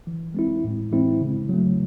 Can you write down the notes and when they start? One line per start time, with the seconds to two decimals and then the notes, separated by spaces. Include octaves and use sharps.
0.07 E3
0.34 G#3 C4 E4
0.64 A2
0.92 E3 G#3 C4 E4
1.21 C#3
1.49 F#3 A3